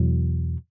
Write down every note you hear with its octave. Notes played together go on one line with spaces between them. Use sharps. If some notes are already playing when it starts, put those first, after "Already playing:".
Already playing: E2 B2 F#3